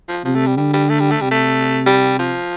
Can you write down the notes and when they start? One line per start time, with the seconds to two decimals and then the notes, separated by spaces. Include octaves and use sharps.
0.08 F3
0.25 C3 F3
0.35 A3
0.46 G3
0.57 D3 G3
0.73 G3
0.89 A3
1.00 G3
1.11 A3
1.21 C3 G3
1.31 A3
1.87 G3
2.19 F3